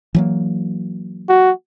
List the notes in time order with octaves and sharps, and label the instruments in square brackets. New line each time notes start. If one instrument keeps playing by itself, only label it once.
[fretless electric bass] E3 F#3 A#3
[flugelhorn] F#4